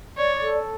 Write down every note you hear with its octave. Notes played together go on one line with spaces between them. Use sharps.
C#5 D5
A4